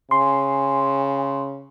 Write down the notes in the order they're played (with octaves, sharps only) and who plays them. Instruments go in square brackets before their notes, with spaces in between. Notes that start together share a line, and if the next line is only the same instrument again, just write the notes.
[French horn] C#3 [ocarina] G#5 [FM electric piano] C6